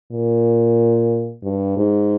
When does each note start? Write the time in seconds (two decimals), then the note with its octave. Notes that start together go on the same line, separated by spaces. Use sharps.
0.12 A#2
1.44 G2
1.77 G#2